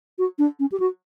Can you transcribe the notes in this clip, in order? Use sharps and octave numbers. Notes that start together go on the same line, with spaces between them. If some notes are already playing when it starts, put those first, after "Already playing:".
F#4
D4
C#4
G4
F#4